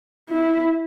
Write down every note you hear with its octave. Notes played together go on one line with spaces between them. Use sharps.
E4